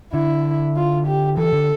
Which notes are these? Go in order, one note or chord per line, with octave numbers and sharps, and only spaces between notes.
D3 E4
F4
G4
E3 A4
D3